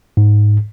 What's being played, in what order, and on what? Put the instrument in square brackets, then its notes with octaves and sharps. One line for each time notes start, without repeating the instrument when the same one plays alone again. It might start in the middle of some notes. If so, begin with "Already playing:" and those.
[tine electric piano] G#2